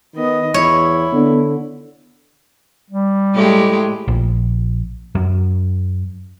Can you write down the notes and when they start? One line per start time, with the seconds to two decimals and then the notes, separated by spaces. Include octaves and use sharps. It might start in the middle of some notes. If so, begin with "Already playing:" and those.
0.15 D#3 B3 D#5
0.54 E2 E4 C#5
1.13 D3 B3
2.90 G3
3.35 A2 G#3 A3 G4
4.08 A#1
5.15 F#2